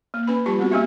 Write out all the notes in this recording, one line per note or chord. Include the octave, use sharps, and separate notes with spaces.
A#3
C#4 B4 B5
F3 G3 F4 G4 A5
B3 C4 F#4
A3 A#3 C#4 G4 E5